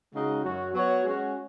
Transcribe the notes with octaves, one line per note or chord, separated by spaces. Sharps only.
C#3 G#3 D#4 F#4
F#2 F#3 C#4 F#4
F#3 B3 F#4 C#5
G#3 C#4 F#4